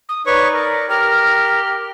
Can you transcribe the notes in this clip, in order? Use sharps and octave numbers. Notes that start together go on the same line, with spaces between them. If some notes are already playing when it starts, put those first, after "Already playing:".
D#6
D#4 B4 C#5 D5 C#6
A#4
G4 A#4 F6